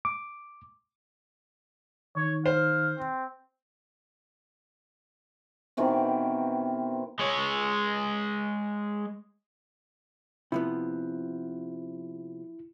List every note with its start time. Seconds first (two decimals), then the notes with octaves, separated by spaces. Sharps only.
0.05 D6
2.17 D#3 C#5
2.46 C5 F5
2.98 C4
5.77 B2 D#3 E3 C4
7.19 G#3 C#5
10.52 C3 F3 B3 E4